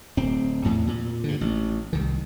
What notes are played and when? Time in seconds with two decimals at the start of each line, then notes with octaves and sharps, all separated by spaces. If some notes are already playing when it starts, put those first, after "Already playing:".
0.17 D1 C4
0.65 E2 A2
0.87 A#2
1.24 G2 D3
1.41 A1
1.93 C2 D#3